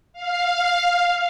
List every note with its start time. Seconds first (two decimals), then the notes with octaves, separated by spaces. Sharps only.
0.13 F5